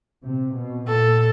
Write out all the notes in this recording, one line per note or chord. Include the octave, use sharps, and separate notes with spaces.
C3
B2
A#2 A4